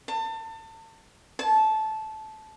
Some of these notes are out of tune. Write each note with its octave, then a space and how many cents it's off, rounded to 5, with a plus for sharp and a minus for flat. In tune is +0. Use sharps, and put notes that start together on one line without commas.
A5 +30
A5 -15